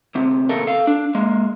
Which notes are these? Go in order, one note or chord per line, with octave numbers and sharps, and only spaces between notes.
D2 C3
E2 A#2 C#3 A4 A#4
A4 F5
D4
G#3 A#3